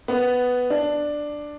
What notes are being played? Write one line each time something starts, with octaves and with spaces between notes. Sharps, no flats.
B3
D4